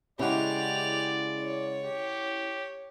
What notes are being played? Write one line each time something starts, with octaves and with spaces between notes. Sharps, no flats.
C#3 G#3 C#4 E4 G4 D5 F#5 F7
C#5
G4